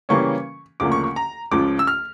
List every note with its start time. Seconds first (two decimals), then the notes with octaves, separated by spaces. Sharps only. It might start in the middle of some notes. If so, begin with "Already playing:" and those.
0.09 C#3 E3 G3 A#3 C#4 C#6
0.80 D2 C#3 F3 A#3 D6
0.92 C#6
1.04 C#6
1.16 A#5
1.51 C#2 C#3 F3 D6
1.79 E6
1.87 F6